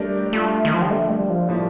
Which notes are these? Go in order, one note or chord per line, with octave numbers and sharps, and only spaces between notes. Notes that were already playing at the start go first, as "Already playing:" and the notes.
Already playing: G3 A3 D4 G4 A#4
G3 A3 D4 F4 A4
D#3
F3
G3
D3 F3 A3 A#3
G3
F3
A2 F3 G3 A#3